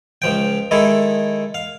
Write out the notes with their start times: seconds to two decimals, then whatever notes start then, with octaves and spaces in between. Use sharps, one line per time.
0.22 C#2 F3 G5
0.71 D#3 G#3 E4 A4
1.54 F5